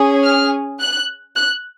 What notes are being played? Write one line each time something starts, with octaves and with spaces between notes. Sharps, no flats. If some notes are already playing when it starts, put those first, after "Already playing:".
Already playing: C#4 G#4
F6
F#6
F#6